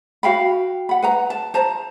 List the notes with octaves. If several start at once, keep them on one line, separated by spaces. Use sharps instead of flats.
F#4 F5 G5 B5
F#5 B5
B4 F#5 A#5
A5
C5 A5 A#5